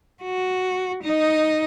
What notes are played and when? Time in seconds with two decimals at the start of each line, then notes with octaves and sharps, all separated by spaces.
0.23 F#4
1.03 D#4 D#5